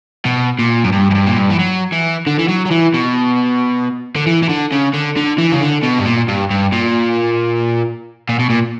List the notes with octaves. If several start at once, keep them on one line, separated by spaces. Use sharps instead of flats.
B2
A#2
F#2
G2
F#2
G2
A#2
G2
E3
F#3
E3
D3
E3
F#3
F#3
E3
B2
D3
E3
E3
D3
C#3
D3
D3
E3
C#3
D3
B2
G2
A#2
G2
G2
A#2
A#2
B2
A#2